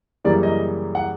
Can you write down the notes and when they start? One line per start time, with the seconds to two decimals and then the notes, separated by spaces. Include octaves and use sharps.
0.24 F#2 C#3 E3 G3 A#3 D5
0.43 D#5
0.95 F#5